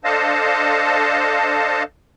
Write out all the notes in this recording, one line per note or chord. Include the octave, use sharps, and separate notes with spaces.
D4 A4 C5 D#5 F5 A5